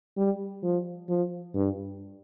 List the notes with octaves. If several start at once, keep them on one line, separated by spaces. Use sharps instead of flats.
G3
F3
F3
G2